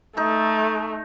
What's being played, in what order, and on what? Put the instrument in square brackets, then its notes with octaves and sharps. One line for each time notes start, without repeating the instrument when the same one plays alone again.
[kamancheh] A3 [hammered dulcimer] D#4 A4